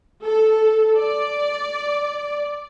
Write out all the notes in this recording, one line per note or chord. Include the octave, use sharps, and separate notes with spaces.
A4
D5